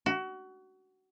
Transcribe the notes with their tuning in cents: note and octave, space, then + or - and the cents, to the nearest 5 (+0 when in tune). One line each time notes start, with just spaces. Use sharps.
F#4 +25